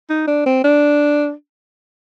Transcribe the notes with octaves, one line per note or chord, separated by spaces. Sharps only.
D#4
D4
C4
D4